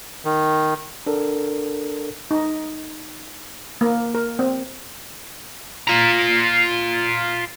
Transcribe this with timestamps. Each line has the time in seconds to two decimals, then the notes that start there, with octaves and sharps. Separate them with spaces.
0.25 D#3
1.06 D4 A4 A#4
2.31 D#4
3.81 A#3
4.15 A#4
4.39 C4
5.88 F4 A#5